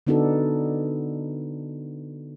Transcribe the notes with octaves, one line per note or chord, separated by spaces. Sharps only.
D3 B3 D4 D#4 F#4 A4